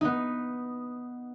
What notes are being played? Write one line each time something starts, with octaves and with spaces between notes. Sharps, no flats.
B3 D#4